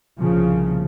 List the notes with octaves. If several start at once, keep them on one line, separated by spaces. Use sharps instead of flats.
C2 A#2 C#3 F3